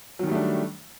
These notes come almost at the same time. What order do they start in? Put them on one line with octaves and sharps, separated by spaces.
F#3 D#3 G3 A3 D4